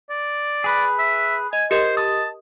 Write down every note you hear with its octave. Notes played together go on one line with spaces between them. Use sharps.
D5
G#4 B4
E5
D#5 G#5
G4 A#4 C5 D#5
A5 D#6